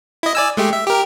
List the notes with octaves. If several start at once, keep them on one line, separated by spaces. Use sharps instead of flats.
E4 D#5
D5 G#5 E6
G#3 A3 G4
E5
G4 A#4